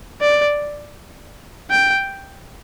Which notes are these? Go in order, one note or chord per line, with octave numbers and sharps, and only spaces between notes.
D5
G5